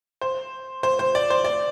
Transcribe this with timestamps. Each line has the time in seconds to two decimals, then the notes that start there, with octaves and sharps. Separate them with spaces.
0.21 C5
0.83 C5
0.99 C5
1.15 D5
1.30 C5
1.44 D5